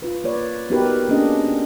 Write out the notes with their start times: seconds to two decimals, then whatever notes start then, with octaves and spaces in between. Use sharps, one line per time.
0.02 F4 B4
0.24 A#3 B4 C#5 D5
0.70 B3 D#4 F#4 G4 A#4 B4
1.08 A#3 C#4 D4 G4 G#4 D#5